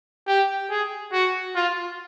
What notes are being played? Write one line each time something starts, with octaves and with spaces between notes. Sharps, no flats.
G4
G#4
F#4
F4